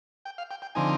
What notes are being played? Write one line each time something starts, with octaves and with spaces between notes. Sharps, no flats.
G5
F5
G5
G5
D3 F3 C4 D#4 G#5